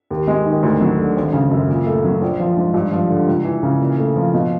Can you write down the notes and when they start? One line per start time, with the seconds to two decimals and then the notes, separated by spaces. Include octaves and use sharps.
0.10 D#2
0.27 G#3
0.46 D#3
0.63 D2
0.81 F#3
0.98 D3
1.16 G#1
1.33 C#3
1.51 F#2
1.69 A#2
1.87 A3
2.04 F#3
2.22 A#1
2.40 F3
2.57 G#2
2.74 G2
2.92 F3
3.10 D3
3.27 C#2
3.45 E3
3.63 C#3
3.80 A#2
3.98 A3
4.16 F3
4.34 B2